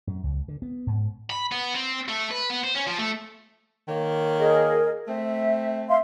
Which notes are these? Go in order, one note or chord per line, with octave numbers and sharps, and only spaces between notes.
F#2
C#2
D3
B3
G#2
B5
B3
C4
A3
B4
B3
C5
C#4
F3
A3
D#3 A#3 C#5
G#4 A#4 D#5
A3 C4 E5
E5 F5 C6